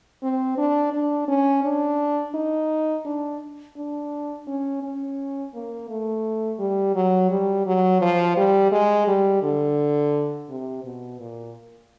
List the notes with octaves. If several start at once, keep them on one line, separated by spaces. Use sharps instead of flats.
C4
D4
D4
C#4
D4
D#4
D4
D4
C#4
C#4
A#3
A3
G3
F#3
G3
F#3
F3
G3
G#3
G3
D3
C3
B2
A#2